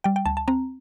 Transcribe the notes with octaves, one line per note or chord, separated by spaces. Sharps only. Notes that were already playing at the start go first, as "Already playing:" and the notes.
G3 G5
G5
D2 A5
A5
C4 A#5